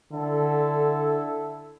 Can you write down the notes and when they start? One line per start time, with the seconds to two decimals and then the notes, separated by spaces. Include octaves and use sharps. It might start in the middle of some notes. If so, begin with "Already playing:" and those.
0.12 D3 E4 A4